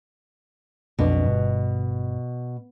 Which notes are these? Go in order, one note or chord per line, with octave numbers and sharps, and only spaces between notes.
B1 F2 B2 D4
G1